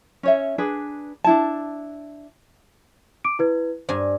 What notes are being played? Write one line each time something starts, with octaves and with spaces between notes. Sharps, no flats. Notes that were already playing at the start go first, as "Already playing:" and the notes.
C#4 C#5 E5
D4 G#4 B4
D4 E4 A5
D6 D7
E4 B4 G#6
G2 C5 G#5